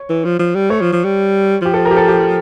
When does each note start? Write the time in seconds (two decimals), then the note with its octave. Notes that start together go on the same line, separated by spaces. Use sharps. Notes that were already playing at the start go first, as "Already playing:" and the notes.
Already playing: C#5
0.09 E3
0.25 F3
0.39 F3
0.55 G3
0.70 A3 C#5
0.81 F3
0.93 F3
1.04 G3
1.62 F3 G4
1.74 A4
1.85 A#4
1.91 G4
1.97 A4
2.08 G4